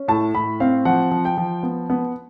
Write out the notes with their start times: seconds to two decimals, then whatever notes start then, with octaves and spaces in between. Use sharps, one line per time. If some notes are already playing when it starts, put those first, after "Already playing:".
Already playing: C#4
0.08 A2 A5
0.34 A2 B5
0.60 C4 F5
0.85 F3 F#5
1.11 F3
1.25 G5
1.38 F3
1.63 B3
1.90 B3